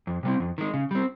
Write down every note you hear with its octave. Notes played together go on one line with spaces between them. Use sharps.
F2
C3 G3 C4
F2
D#3 G#3
C#3
G3 C4